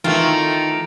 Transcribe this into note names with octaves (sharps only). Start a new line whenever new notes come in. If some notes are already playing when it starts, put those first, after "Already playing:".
D#3 E3 A3 F4 A#5 D6